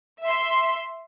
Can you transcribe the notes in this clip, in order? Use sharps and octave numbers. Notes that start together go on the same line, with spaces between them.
E5 C6